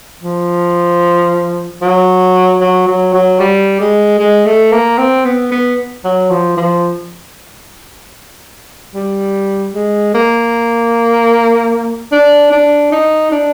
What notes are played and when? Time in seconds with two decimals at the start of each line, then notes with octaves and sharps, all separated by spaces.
0.23 F3
1.81 F#3
2.61 F#3
2.87 F#3
3.14 F#3
3.40 G3
3.80 G#3
4.19 G#3
4.46 A3
4.72 A#3
4.98 C4
5.25 B3
5.51 B3
6.04 F#3
6.31 F3
6.57 F3
8.95 G3
9.74 G#3
10.14 A#3
12.12 D4
12.52 D4
12.92 D#4
13.31 D4